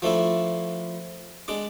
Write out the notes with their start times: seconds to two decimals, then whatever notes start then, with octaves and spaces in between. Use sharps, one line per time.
0.02 F3 A3 D4 E4
1.48 G#3 D4 D6